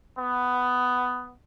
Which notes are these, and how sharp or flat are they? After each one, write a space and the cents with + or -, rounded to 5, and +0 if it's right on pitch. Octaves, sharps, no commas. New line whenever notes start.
B3 +10